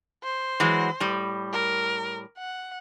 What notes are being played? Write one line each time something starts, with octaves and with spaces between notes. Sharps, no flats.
C5
E3 F#3 G#3
A2 G3
A#4
F#5